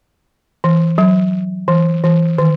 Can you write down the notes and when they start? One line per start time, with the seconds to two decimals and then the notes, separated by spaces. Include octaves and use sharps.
0.64 E3
0.98 F#3
1.68 E3
2.04 E3
2.38 D#3